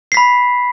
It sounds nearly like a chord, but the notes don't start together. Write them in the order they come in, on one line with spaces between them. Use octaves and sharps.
C7 B6 B5